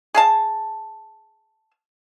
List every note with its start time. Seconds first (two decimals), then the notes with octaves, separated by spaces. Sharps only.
0.15 G#4 F5 A5